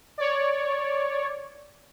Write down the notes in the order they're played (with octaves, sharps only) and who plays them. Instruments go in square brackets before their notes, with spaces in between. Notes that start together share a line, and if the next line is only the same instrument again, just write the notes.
[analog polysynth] C#5 D5